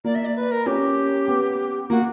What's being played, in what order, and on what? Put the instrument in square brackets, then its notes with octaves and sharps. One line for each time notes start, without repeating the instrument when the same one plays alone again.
[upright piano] A#3 [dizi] D5
[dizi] E5
D5
B4
A#4
[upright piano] C#4 [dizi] G4
[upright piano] B3
[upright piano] A#3 [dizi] F#4